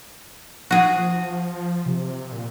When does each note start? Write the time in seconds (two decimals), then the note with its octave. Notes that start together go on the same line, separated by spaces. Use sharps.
0.71 F3 F#4 G#4
1.86 C3
2.32 A#2